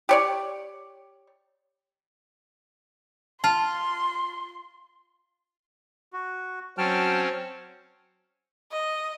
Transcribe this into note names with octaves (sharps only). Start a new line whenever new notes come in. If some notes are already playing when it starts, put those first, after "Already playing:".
G4 C#5 D5
F4 A5 C6
F#4
F#3 C4 C#4 G5 A5 F6
D#5